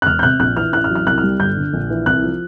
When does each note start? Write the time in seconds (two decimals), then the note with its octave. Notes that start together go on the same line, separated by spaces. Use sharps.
0.02 F#6
0.06 E1 F6
0.19 G6
0.23 C3 F#6
0.40 A#1 F#6
0.56 E3 F6
0.73 A1 F#6
0.84 F6
0.90 F#3
0.95 F6
1.06 C2 F#6
1.18 F6
1.23 G3
1.40 G1 G6
1.57 D3
1.73 A#1
1.90 E3
2.06 C2 F#6
2.23 F3